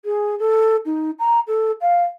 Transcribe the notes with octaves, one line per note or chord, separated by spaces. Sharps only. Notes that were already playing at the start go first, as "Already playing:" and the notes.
G#4
A4
D#4
A#5
A4
F5